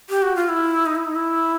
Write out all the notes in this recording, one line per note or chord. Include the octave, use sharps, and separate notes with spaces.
G4
F#4
F4
E4
D#4
E4
D#4
E4